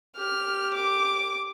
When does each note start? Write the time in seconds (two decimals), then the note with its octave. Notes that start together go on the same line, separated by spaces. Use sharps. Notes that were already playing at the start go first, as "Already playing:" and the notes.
0.17 G4 F6
0.74 D6